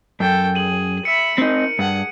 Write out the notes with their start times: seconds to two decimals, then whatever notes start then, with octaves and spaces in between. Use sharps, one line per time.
0.20 F#2 A4 G5
0.55 G#4 D#7 F#7
1.05 E5 B5 C#7
1.38 C4 D#4 A#4
1.79 G2 G#4 F#5